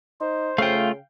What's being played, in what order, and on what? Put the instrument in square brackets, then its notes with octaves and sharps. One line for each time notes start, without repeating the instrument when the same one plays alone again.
[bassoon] D#4 [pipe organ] C5
[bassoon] C#3 [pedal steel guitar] A3 F4 [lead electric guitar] F5 G5